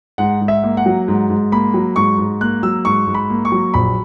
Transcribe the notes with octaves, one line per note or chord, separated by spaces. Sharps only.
G#2 F#5
G#2
E5
A#3
F#5
F#3
G#2
G#2
A#3 B5
F#3
G#2 C#6
G#2
A#3 F#6
F#3 E6
G#2 C#6
G#2
B5
A#3
C#6
F#3
A#1 B5